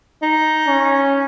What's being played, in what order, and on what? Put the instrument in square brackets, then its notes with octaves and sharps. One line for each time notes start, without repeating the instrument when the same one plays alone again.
[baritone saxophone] D#4
[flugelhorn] C#4